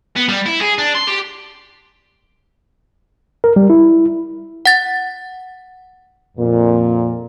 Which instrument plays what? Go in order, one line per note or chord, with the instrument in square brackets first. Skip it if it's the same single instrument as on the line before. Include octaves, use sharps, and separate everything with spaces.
[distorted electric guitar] B3
G3
E4
G#4
D4
C6
G4
[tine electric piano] A#4
G3
E4
[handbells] F#5 A6
[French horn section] F2 A#2